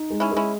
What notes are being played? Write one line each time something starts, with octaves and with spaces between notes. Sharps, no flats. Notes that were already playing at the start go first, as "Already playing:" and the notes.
Already playing: D#4
G#3
C#4 E4
G#3
C#4 E4